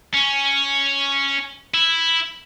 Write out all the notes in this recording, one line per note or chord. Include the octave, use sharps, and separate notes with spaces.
C#4
E4